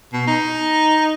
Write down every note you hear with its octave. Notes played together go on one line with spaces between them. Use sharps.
B2
D#4